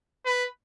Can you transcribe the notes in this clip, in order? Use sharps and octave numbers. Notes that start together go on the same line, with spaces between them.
B4